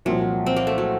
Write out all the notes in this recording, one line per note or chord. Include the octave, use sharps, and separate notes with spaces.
C2 A#2 F3 F#3
C4
A#3
A3
F#3